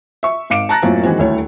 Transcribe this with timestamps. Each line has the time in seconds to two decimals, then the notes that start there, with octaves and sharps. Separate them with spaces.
0.23 E5 C#6
0.50 G#1 F5 D6 C#7 D7 E7
0.69 A5 A#5 F#6 A6 A#6
0.82 F#2 A2 F#3 A#3 C4 F4
1.03 D#3 E3 G#3 C4 F#4
1.18 D#1 D2 A3 E4 C#5